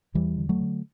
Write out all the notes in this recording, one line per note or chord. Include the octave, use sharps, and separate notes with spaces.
E2 E3 G3
D3
F#3 A3
D3